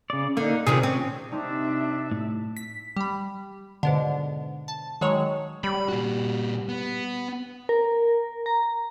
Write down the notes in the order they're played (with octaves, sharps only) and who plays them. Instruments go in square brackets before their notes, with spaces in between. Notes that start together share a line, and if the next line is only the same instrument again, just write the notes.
[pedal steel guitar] C#3 D5
[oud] D3 [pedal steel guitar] A#3 D#4
[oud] C3 D#3 F3 [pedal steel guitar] G#4
[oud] C4 [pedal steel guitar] C#4
[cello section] C3 E5 [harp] C4 D#4 [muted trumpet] D4
[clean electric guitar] A2
[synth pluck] B6
G3 B5
G#2 B2 D3
A5
D#3 F#3 G#3 C#5
[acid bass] G3 [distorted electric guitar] B5
[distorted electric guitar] A#2 F#4
B3
[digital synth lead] A#4
A#5